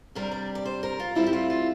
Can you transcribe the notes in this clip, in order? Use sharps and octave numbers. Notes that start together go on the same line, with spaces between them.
C3 G3 D4 A#4
D5
D5
C5
A#4
F4
A2 G3 C4 E4 F4
G4
F4
F4